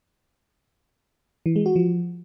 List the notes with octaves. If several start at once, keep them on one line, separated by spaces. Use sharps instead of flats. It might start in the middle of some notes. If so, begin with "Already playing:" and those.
E3
G#3
F#4
F3